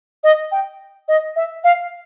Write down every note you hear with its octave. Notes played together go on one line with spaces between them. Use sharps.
D#5
G5
D#5
E5
F5